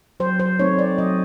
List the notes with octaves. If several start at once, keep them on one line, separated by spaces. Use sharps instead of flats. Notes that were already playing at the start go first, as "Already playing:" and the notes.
F#3 C5
C5
A3 C4 D#4 C#5
D5
F#3 D#5